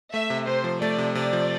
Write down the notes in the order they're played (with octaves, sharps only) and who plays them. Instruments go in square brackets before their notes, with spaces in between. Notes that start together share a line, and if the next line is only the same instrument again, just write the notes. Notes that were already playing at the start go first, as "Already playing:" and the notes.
[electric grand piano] A3 [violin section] E5
[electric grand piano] C3
[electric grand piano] C3 [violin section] C5
[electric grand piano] F3
[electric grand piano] A3 [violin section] D5
[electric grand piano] C3
[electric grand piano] C3 [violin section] D5
[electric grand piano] F3